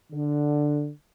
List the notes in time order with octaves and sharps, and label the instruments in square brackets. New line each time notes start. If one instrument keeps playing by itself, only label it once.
[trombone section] D3